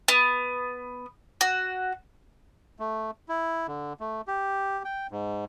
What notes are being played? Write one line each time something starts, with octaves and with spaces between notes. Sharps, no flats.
B3
F#4
A3
E4
D3
A3
G4
G5
G#2